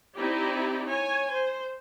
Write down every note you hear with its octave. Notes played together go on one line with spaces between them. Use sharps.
C4 D#4 E4 G4 D5
C#5 G#5
C5